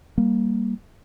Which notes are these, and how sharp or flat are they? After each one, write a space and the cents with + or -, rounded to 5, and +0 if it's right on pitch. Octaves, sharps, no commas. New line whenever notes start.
G3 +0 A#3 +0